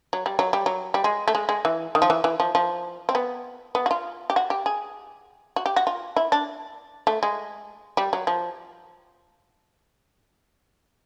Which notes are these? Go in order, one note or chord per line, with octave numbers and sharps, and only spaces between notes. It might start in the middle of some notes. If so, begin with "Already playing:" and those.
F#3
G3
F#3
G3
F#3
G3
G#3
A3
G#3
G#3
E3
D#3
F3
E3
E3
F3
F3
C4
B3
B3
F#4
F4
G4
F#4
G4
G#4
F#4
G4
F#4
F4
E4
D4
A3
G#3
G3
F#3
F3